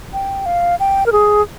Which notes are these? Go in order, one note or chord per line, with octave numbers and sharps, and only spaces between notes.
G5
F5
G5
A#4
G#4